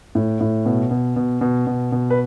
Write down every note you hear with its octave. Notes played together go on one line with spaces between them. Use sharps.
A2
A2
B2
B2
B2
B2
B2
B2
B4